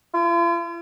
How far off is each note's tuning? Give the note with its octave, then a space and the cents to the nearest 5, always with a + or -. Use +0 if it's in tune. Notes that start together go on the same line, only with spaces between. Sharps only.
F4 -45